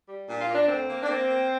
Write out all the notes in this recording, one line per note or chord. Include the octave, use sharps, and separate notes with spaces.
G3
A#2 D4
F4
A#3
D4
D2 C4
A#3
D4
A#3 C4
A#3